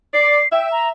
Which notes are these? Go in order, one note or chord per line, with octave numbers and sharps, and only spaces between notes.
D5 C7
E5 G5
A#5